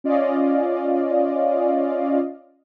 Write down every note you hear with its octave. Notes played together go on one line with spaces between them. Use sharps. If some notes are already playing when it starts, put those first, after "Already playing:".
C#4 F4 D5 D#5 F5